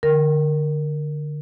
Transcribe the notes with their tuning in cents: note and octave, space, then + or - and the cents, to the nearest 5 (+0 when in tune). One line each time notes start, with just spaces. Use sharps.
D3 +15 A#4 +0